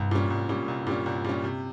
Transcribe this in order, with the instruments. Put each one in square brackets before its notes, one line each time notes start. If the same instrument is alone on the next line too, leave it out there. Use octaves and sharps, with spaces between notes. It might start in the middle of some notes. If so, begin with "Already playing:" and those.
Already playing: [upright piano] C2 [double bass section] G2
[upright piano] A#2 G3 C#4
[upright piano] C2 [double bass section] G#2
[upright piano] A#2 G3 C#4
[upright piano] C2 [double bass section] G2
[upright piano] A#2 G3 C#4
C2
A#2 G3 C#4
C3